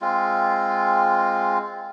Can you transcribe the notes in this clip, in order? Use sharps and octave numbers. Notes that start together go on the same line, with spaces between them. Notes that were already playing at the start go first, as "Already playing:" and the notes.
G#3 C4 F4